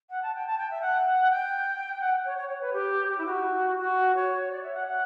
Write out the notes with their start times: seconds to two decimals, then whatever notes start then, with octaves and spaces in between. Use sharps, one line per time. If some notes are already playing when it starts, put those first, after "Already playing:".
0.10 F#5
0.22 A5
0.34 G5
0.47 A5
0.58 G5
0.70 E5
0.81 F#5
1.30 G5
2.00 F#5
2.25 C#5
2.37 C#5
2.48 C#5
2.60 B4
2.73 G4
3.08 G4
3.17 E4
3.25 F#4
3.79 F#4
4.15 C#5
4.51 D5
4.62 E5
4.74 F#5
4.86 F#5